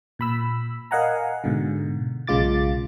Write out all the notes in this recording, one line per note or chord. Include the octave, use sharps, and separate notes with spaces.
A#2 B5 E6
A#4 D#5 F5 F#5 G#5 A#5
G#2 B2 D3
B1 C#3 G#3 F4 D6 A6